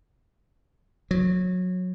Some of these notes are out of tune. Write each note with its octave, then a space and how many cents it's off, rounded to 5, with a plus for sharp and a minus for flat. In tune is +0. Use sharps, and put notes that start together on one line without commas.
F#3 -20